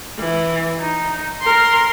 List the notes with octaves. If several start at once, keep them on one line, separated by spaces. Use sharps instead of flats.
E3
D#4
A#4 C6